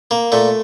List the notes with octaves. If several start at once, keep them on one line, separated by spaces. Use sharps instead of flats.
A#3
A#2 A3